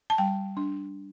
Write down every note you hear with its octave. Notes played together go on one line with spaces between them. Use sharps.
A5
G3 G5
D4